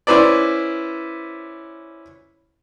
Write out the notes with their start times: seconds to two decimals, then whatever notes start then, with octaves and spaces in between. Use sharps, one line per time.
0.07 C#4 E4 B4 C5 D5